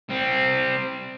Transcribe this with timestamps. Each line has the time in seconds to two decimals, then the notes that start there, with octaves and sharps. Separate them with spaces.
0.09 G3 C4